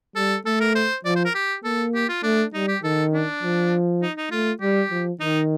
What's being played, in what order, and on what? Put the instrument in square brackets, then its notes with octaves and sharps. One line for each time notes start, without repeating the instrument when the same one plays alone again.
[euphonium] G3 [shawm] A4
[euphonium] A3 [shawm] A4
[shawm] A#4
C5
[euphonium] F3 [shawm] D5
[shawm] C5
A#4
G4
[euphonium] A#3 [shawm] A4
[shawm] G4
F4
[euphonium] A3 [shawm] D4
[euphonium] G3 [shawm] D#4
[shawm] G4
[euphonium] D#3 [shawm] A4
[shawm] D4
[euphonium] F3
[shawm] D#4
D#4
[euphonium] A3 [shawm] F4
[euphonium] G3 [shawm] G4
[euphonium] F3
[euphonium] D#3 [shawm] D#4